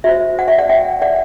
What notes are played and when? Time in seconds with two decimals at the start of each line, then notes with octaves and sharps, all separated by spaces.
0.04 F#4 C5 E5
0.39 F#5
0.48 E5
0.58 D5 F#5
0.69 E5 G5
1.02 D5 F#5